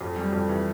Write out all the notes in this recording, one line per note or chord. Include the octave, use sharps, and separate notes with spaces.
F2
G3
F2
E3